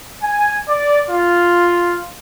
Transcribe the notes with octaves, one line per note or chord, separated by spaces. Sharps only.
G#5
D5
F4